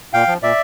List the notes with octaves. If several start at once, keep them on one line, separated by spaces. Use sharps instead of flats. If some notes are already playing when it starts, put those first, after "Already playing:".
A#2 F5 G5
F3
A#2 D5 E5